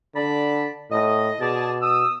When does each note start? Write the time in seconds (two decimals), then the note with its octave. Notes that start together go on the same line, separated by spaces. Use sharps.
0.15 D3 D5 A5 B5
0.91 A2 D#5
1.40 B2 G#4 D5 A5
1.82 D#6 E6